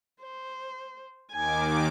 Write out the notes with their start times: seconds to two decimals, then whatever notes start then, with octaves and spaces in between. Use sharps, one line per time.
0.23 C5
1.32 D#2 D#3 G#5 D6